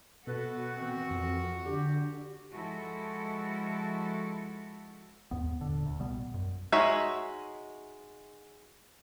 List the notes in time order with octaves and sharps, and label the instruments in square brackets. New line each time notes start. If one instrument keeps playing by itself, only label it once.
[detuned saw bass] B2 [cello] F#4 [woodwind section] A4 B4
[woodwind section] D#3 E3 C4
[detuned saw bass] F2
[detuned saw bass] D3 [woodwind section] G4
[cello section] F3 G#3 E4 F#4 A4
[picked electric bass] D#2 G#2 B3
D#1 D3
D2
A#1 B2 G3 B3
F#2
[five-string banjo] G#3 D#4 F#4 C#5 E5